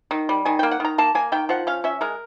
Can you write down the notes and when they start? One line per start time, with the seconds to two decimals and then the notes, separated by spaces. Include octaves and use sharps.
0.11 D#3
0.29 G3
0.45 D#3 G#5
0.59 A#3 G5
0.71 F#5
0.80 D#3 A#5
0.98 A#3 A5
1.15 A#3 G#5
1.32 D#3 G5
1.49 F3 F#5
1.67 C#4 F5
1.84 C#4 E5
2.01 G#3 A#4